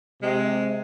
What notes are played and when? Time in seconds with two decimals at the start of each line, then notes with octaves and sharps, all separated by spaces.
0.23 C3 G#3